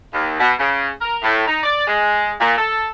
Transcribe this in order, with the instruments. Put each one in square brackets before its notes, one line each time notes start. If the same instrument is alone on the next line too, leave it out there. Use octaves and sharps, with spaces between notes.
[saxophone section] D#2
B2
C#3
A#4
A2
D#4
D5
G#3
A#2
A4